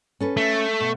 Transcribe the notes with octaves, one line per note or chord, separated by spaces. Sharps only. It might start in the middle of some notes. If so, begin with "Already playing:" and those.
C#4 A4 B4
A3
B2